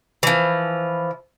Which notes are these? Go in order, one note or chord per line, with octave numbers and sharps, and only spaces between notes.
E3 F3